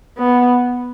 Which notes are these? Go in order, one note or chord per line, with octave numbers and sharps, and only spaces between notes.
B3